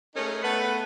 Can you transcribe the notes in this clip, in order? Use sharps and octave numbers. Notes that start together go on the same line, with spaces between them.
A3 C#4 D#4 G#4 A#4
A3 B3 B4